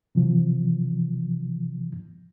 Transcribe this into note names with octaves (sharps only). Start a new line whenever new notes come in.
C3 E3 F3